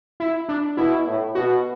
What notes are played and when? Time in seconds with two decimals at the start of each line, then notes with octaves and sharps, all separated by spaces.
0.20 E4
0.49 D4
0.77 B2 E4
1.07 A2
1.35 B2 F#4